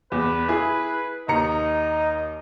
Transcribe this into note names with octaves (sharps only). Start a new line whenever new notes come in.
E2 B4
E4 G#4
D#2 D#4 A#5 C#7